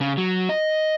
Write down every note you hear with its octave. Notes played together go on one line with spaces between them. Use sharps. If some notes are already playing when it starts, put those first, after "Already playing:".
C#3
F#3
D#5